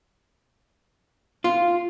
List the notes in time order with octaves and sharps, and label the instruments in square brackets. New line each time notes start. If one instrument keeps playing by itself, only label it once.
[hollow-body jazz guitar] F4